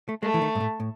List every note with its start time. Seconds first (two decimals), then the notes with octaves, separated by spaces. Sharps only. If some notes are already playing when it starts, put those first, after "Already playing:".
0.09 A3
0.22 G#3 A3
0.34 E3
0.42 D#3
0.55 G#2
0.60 A2
0.80 A2